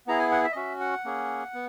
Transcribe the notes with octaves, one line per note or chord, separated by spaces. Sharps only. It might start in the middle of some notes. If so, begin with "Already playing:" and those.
B3 E4 G#4 A#5
G#5
F#5
E5
D#5
C#4 F#4 E5
F#5
A#3 C#4 G#4
B3